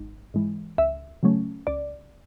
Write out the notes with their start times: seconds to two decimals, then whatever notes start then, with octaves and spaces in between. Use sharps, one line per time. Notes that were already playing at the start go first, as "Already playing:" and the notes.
Already playing: G#1
0.34 G#2 E3 G#3
0.78 C#2 E5
1.23 C#3 F#3 A3 C#4
1.67 C#2 D5